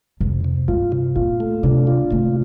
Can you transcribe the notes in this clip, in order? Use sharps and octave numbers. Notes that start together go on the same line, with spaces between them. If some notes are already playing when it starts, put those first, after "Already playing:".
F2 C3
C3
G2 F4
C3
A#2 F4
A3
C3 D4
F4
C3 A3